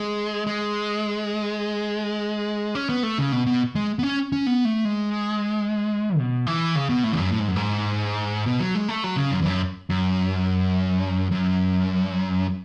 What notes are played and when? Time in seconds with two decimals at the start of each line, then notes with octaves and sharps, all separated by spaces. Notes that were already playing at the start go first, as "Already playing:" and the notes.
Already playing: G#3
0.47 G#3
2.75 C#4
2.89 B3
3.03 A3
3.18 C#3
3.32 B2
3.47 B2
3.75 G#3
3.99 B3
4.03 C#4
4.32 C#4
4.47 B3
4.65 A3
4.85 G#3
6.18 B2
6.47 E3
6.75 C#3
6.89 B2
7.04 A2
7.12 E2
7.18 F#2
7.31 A2
7.40 G#2
7.48 F#2
7.56 G#2
8.46 B2
8.60 F#3
8.75 G#3
8.88 A3
9.04 F#3
9.17 C#3
9.32 F#2
9.41 E2
9.46 F#2
9.90 F#2
11.31 F#2